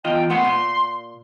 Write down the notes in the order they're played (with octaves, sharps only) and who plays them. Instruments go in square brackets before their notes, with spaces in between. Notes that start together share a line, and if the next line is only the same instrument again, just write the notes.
[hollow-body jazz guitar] E2 F4 D#5 [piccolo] G5
[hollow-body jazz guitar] A3 B3 F#5 [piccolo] C6
[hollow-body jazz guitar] A#2